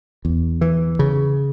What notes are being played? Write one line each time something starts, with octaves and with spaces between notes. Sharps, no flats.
E2
E3
C#3